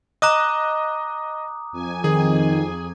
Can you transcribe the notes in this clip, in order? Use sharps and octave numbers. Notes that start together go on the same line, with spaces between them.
D#5 A#5 D6 D#6 F#6
F2 G#5
D#3 G#4